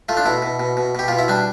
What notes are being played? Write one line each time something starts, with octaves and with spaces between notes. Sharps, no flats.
A3 F4
D4
B2 E4
B2
B2
B2
B2 G4
B2 F4
E4
G3 D4